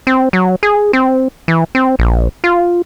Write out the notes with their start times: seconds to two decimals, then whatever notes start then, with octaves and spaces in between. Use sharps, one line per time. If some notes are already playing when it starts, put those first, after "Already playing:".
0.07 C4
0.33 F#3
0.63 G#4
0.93 C4
1.48 E3
1.75 C4
1.99 A#1
2.44 F4